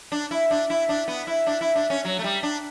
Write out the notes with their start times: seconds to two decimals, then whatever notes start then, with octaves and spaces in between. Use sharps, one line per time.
0.12 D4
0.31 E4
0.51 D4
0.70 E4
0.89 D4
1.08 B3
1.27 E4
1.47 D4
1.61 E4
1.75 D4
1.90 C#4
2.05 F#3
2.19 A3
2.24 G3
2.43 D4